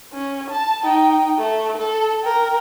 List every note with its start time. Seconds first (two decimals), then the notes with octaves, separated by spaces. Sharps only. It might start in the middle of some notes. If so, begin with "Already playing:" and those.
0.13 C#4
0.50 A5
0.83 D#4 G5
1.38 A3
1.78 A4
2.23 A#4 G5